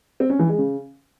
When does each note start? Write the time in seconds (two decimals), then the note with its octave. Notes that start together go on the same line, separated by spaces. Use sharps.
0.20 C4
0.30 C#4
0.39 E3
0.49 G#3
0.58 C#3